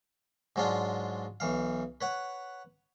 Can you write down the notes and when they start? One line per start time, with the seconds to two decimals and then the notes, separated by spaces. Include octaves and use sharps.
0.56 G#2 F#3 G#3 D4 F4
1.40 B1 E3 F5
2.01 B4 C#5 F#5